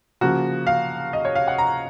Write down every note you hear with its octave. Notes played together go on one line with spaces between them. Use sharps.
C#3 F3 A#3 F#4
F5
D#5
C#5
F5
F#5
A#5